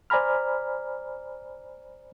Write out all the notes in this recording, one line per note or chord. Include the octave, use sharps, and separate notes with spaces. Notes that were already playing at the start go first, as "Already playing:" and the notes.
C5 D5 G#5 A#5 B5 F6